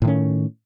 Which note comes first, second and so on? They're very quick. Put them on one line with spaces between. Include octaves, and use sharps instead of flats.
A2 D#3 C#4